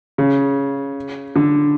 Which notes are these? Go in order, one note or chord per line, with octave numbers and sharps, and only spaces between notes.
C#3
D3